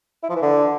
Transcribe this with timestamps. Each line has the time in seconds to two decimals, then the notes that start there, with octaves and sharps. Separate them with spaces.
0.23 E4
0.30 F3
0.36 E3
0.42 D3